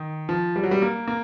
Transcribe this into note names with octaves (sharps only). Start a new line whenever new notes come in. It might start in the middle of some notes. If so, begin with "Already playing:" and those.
Already playing: D#3
F3
G3
F#3
G3
A#3
A#3